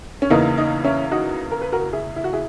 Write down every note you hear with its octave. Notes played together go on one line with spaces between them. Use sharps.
C#4
E2 C#3 E3 A#3 D#4
D#4
C#4 E4
D#4 F#4
A#4
B4
F#4 A#4
E4 G#4
E4
F#4
E4 G#4